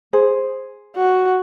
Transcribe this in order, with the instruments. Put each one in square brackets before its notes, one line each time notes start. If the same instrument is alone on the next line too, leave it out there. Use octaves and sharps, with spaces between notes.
[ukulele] G#4 C5
[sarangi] F#4